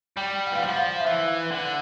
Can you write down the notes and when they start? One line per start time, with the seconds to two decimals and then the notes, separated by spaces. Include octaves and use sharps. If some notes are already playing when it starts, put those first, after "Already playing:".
0.17 G3 G5
0.47 F#5
0.52 E3 F5
0.62 F3 F#5
0.77 F5
1.00 E5
1.06 E3 F5
1.51 D3